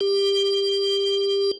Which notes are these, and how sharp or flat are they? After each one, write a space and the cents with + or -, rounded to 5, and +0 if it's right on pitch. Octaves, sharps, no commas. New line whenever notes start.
G4 +20